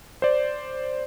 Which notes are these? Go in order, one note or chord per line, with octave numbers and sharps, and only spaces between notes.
C5 D5